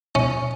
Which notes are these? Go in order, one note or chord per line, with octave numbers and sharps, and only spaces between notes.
C#4